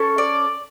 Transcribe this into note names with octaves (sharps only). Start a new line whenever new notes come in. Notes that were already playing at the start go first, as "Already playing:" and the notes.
Already playing: C#4 A4
D5